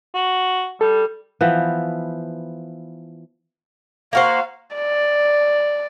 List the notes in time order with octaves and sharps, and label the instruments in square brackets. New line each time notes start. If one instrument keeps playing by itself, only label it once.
[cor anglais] F#4
[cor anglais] G3 [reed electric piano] A4
[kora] E3 F3 B3
[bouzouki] A#3 F#4 C5 [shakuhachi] F5
[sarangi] D5